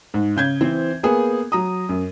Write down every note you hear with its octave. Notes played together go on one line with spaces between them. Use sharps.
G#2
C#3 G6 G#6
E3 C4 C5
A#3 B3 G#4
F#3 A#5 D#6
F#2